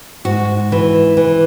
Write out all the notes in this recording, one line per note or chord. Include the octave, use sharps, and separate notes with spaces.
G#2 F#4
E3
E3